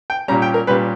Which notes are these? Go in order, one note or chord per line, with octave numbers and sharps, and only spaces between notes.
G5
A#2 G3 C#4 A#5
G5
A#4
A#2 G3 C#4 B4